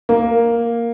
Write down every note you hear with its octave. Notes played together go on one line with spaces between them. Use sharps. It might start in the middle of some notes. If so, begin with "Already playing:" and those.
A#3